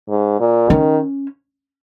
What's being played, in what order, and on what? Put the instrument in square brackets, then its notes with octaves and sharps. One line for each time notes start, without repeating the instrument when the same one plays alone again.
[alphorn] G#2
A#2
[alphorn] D#3 [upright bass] C#4